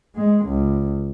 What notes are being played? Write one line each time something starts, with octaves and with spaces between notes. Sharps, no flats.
G#3
C#2